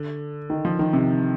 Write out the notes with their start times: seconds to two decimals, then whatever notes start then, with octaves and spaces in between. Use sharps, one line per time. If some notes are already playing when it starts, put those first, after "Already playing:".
Already playing: D3
0.50 D#3
0.65 F3
0.79 D#3
0.93 C3